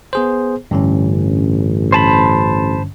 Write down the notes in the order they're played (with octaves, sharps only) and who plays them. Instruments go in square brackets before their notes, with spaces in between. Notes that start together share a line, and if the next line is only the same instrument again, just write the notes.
[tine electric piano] B3 G#4 C5
[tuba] A1 [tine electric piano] G2 D3 C#4
[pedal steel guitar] C5 A5 B5